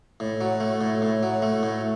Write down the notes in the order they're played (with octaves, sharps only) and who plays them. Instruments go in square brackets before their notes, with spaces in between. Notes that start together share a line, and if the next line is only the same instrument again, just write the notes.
[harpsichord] A2
F#3
A3
A2
A2
F#3
A3
A2